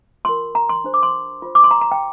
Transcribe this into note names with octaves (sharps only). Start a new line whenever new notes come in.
F4 A#4 C6
A#5
C6
D4 G4 C5
D6
C6
F4 C5
D6
C6
A#5
A#5
G5